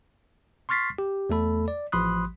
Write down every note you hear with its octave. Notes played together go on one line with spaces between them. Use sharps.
C6 C#6 F6 A6 B6 C7
G4
E2 A3 A4 B5
D5
A1 F3 B5 C6 D#6 F#6